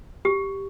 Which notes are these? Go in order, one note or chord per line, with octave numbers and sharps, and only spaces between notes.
G4